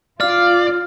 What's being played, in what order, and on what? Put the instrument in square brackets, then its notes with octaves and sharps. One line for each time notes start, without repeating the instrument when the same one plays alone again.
[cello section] F4 [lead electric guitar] D5 [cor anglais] F5 [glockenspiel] F6